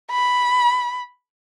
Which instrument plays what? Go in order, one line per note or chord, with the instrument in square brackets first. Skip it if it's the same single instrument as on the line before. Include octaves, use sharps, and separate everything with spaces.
[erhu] B5